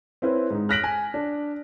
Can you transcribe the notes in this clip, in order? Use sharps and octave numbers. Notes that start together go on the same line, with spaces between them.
C4 C#4 E4 B4 C5
G#2 D#4
F6 F#6 A#6 B6 D7 F#7
G#5
D4